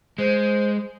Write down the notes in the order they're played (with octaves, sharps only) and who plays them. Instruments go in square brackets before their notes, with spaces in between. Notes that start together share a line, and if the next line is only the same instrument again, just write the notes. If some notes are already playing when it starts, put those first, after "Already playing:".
[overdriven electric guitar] G#3 [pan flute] C5